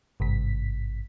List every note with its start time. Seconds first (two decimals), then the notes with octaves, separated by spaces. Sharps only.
0.20 G#1 G2 C3 B6